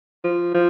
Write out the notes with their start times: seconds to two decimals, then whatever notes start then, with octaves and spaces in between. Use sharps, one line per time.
0.24 F3
0.54 F3